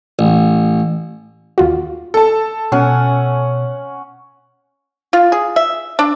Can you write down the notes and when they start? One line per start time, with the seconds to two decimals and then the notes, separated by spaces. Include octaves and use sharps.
0.19 A1
1.58 D#2 F4 F#4
2.14 A4 A5
2.72 B2 C#4 F#5 G#5
5.13 F4
5.32 G#4
5.56 E5
5.99 D4